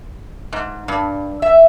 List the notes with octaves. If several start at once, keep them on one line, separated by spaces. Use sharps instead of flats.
G#2
G2
E5